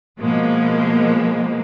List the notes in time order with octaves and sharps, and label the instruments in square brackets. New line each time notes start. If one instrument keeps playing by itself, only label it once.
[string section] B2 F3 G#3 A#3